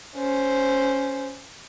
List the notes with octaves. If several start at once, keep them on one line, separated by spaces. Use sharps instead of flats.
C#4 C5